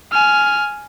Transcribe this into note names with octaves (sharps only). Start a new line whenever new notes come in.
G#5 F6